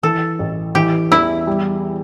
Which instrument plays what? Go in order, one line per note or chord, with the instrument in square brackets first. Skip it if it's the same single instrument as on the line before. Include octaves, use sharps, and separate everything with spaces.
[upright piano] E3 [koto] A4
[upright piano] A1
[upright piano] E3 [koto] G4
[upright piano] E2 [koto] E4
[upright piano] G3